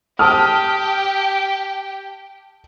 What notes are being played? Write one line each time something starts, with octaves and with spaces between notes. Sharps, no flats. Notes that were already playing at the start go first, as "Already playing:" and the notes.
G4 G5 A5 D#6 F6